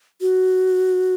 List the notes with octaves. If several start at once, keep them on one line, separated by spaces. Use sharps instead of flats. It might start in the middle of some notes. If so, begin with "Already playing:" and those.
F#4